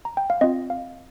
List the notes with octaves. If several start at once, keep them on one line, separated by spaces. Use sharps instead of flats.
A#5
G5
F5
C4 F4 D#5
F5